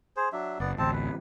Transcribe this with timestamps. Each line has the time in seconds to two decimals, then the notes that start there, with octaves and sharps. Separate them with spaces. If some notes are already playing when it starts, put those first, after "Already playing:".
0.16 G#4 C5
0.33 F#3 D4 E5
0.60 F#1 B3 D5
0.78 A1 D2 C4 A5
0.93 B4